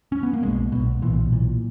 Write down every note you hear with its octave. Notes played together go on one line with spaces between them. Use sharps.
C#4
B3
A#3
B1 B2 G#3
B1 B2
B1 A#2 E3
B1 A#2